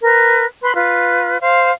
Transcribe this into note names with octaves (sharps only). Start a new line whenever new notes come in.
A#4 B4
B4 B5 C6
F4 B4
C5 F5